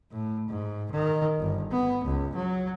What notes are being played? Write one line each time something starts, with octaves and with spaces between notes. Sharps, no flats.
A2
G#2
D#3
G1
B3
C#2
F#3